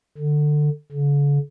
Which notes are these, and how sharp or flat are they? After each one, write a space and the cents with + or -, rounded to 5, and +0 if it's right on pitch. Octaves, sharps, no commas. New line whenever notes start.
D3 +20
D3 -45